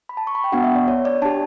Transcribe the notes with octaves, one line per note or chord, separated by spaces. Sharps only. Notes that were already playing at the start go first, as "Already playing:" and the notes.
B5
A5
C#6
B5
G5
B3 D4 F#4 F#5
E5
D5
C#5
D5
D4 G4 A5